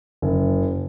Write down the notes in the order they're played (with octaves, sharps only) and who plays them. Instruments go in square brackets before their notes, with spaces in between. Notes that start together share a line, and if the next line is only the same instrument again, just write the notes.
[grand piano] F#1